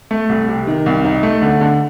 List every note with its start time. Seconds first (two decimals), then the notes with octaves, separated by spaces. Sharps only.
0.11 A3
0.29 C2
0.48 C3
0.67 D#3
0.86 C2
1.05 D#4
1.23 A3
1.42 D3
1.61 D3